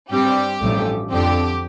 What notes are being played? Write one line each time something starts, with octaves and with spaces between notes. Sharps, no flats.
G2 G3 C4 G4
A1 G2 F3 A3
F2 D3 F3 C4 G4